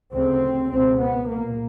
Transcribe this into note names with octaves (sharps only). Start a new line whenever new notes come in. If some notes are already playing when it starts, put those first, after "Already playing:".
D2 C#3 C4
C#2 B2 C4
B3
C2 A#2 A#3